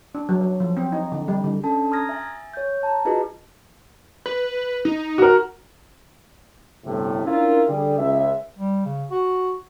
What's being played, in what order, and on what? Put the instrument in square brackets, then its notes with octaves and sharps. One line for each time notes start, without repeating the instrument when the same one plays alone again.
[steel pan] D4
F#3
F#3
F3
C4
D#4
D3
G3
D3
[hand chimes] C#4 D4 A4 A5
A#5 C6 D#6 F6 G#6 A#6
E5 G#5 A6
C#5 G6
A5 A#5
D#4 F4 F#4 G#4 B4 D#5
[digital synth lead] B4
D#4
[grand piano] F#4 A#4
[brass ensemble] G1 A2 C3
C#4 D4 E4 F4 A#4
D3 G3 G#4
C#2 E5
[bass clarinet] G3
C#3
F#4